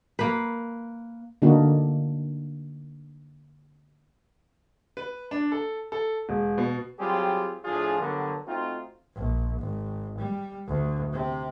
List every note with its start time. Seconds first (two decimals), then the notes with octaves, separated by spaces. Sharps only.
0.19 A#3 B4
1.42 D3 A#3 D4 D#4 F#4
4.97 B4
5.31 D4
5.52 A4
5.92 A4
6.29 E1
6.58 B2
6.99 F#3 G3 C4 F4 G4 G#4
7.65 A2 F3 D4 F4 G#4
7.99 G2 D3 F#3 B3 D4 A#4
8.46 A3 C4 D#4 F4 F#4
9.15 A#1
9.60 G#1
10.18 G3
10.68 D2
11.12 C3